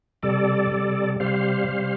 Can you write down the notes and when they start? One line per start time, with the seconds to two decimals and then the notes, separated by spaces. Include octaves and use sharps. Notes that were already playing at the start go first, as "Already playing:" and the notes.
0.23 C3 G3 A4 D5
0.71 C3 G3
1.20 C3 G3 C5 F5
1.68 C3 G3